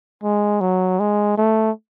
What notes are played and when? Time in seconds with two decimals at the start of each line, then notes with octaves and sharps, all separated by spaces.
0.23 G#3
0.61 F#3
1.00 G#3
1.37 A3